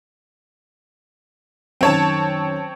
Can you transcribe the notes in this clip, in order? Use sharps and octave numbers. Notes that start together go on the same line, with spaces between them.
F#2 D#3 C4 C#5 A5